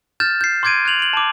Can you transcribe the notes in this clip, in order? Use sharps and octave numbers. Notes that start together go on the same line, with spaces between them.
F6 G6 A6 E7
G6 C7
C6 D6 G6 G#6 D7 D#7
F#6 G#6 F7 F#7
D7 F#7
A5 D6